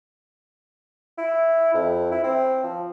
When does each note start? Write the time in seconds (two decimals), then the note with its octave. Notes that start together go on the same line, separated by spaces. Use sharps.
1.18 E4
1.74 F2
2.11 E4
2.23 C4
2.63 F3